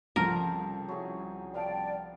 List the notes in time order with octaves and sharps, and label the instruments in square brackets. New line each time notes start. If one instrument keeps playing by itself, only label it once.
[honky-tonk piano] C2 C#3 F3 [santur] A4 C5 A#5 [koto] A#4
[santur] F#3 E4 G#4
[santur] B3 F5 A5 [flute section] D5 G5